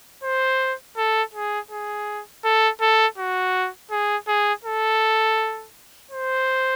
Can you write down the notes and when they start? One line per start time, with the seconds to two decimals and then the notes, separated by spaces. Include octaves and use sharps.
0.23 C5
0.97 A4
1.34 G#4
1.71 G#4
2.44 A4
2.81 A4
3.18 F#4
3.91 G#4
4.27 G#4
4.64 A4
6.11 C5